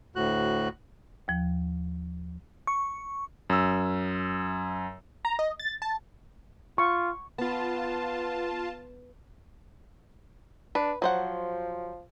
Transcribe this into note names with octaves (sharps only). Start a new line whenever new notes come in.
D2 A2 F#4 F#6
D#2 F3
C#6
F#2 E6
A#5
D#5
A6
A5
F4 C#6
B3 F4 A5
D4 B4
F3 F#3 C5 F#5